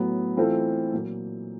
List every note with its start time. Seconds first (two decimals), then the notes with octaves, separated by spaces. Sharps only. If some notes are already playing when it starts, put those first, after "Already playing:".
Already playing: A2 F#3 B3
0.36 E3 A3 C4 F4 A4
0.93 A#2 F#3 A#3